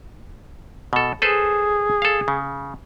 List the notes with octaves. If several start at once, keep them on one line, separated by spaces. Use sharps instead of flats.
B2 A4
G#4 A4 B4 C5
A4 F5
C#3